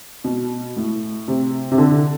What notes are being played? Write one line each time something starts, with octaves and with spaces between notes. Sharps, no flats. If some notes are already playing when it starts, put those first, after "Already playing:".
B2
A2
C3
C3
D3